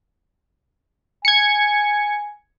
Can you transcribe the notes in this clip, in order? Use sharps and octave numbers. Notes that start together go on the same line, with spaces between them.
G#5 G#6 C#7